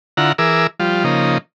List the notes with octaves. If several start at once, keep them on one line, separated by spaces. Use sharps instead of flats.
D3 E4 F4 F#5 A#5
E3 G#4 A#4 D6 E6
F3 G3 F4
C#3 F3 A#3 D#4